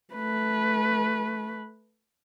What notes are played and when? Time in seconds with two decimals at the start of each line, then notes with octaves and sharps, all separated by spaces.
0.14 A3 B4